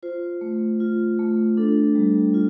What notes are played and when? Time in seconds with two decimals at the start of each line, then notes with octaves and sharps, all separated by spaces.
0.03 F4 C5
0.41 A3
0.80 F4
1.19 A3
1.57 D4 A4
1.95 G3
2.34 F4